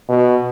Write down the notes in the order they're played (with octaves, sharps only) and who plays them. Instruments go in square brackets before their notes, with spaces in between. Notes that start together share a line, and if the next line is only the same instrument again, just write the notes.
[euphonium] B2